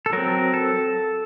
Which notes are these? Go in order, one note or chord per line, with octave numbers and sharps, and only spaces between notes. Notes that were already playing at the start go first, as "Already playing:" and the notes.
A4
F#3 C4 A#4
A4